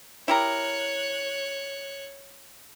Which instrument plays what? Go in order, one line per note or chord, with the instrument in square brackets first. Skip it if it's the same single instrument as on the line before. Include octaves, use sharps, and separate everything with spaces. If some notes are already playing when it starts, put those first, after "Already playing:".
[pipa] E4 G4 A#4 [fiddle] C#5 F#6